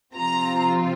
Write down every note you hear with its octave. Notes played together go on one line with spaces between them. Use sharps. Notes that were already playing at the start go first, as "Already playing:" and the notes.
C3 F3 C4 F4 A#5